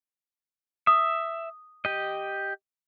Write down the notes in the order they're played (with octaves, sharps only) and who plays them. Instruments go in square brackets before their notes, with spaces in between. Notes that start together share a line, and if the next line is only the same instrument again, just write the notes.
[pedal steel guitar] E5 [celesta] D#6
[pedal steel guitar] G4 D#5